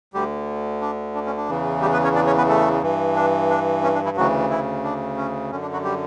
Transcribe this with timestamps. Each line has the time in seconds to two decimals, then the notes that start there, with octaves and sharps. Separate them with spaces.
0.14 D2 D3 G3 G4
0.81 D4
1.15 D4
1.26 C#4
1.37 D4
1.49 E2 C#3 E3
1.82 G3 G4
1.93 B3 B4
2.04 C#4 C#5
2.15 D4 D5
2.27 C#4 C#5
2.38 B3 B4
2.49 A3 A4
2.83 G2 E3
3.16 D4
3.49 D4
3.83 C#4
3.95 D4
4.05 E3 E4
4.17 D2 C#3 E3 F#3 F#4
4.50 E3 E4
4.84 D4
5.17 C#4
5.51 F#2 D3 C#4
5.62 D4
5.73 F#3 F#4
5.84 G3 G4